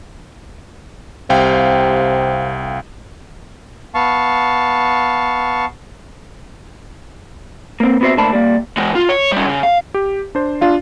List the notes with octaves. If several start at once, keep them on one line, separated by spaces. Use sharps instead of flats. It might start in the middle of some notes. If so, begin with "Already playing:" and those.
C2 C3 F5 G5
B3 F5 A5 C#6
A#3 C4
B3 C4 F#4 B4 C5 E5
D3 A3 A#3 C5 A5 B5
G3 A#3
E3 G#3
F4
C#5
G3 C#4
C#3
F5
G4
D4 C5
D4 F4 F5